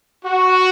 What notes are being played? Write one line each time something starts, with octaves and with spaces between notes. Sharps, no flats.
F#4